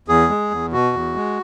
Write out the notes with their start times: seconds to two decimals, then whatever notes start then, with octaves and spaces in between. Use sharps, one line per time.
0.08 E2 G#4
0.30 G#3
0.51 E2
0.73 B2 F#4
0.93 E2
1.15 G#3